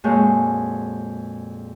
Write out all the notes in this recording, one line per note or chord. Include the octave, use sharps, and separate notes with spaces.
F2 A#2 G#3 F#4 C#5 G6